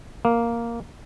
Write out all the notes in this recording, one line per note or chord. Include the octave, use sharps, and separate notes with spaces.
A#3